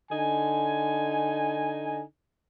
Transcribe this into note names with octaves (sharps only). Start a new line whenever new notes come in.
D3 D#4 G#5